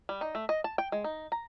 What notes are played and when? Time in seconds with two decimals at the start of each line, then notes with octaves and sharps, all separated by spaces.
0.09 G3
0.21 D#4
0.35 A3
0.49 D#5
0.64 A5
0.78 G5
0.92 G#3
1.04 D#4
1.32 A#5